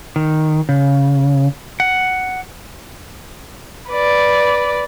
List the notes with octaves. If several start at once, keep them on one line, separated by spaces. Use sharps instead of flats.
D#3
C#3
F#5
B4 D5